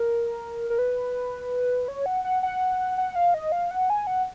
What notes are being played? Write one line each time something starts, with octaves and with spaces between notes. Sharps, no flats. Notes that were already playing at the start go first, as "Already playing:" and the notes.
Already playing: A#4
A#4
B4
C#5
F#5
F#5
F#5
F#5
F5
D#5
F5
F#5
G#5
F#5